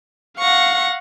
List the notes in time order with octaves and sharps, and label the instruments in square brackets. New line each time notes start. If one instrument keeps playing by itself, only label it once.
[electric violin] F5 F#5 [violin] C#6 A#6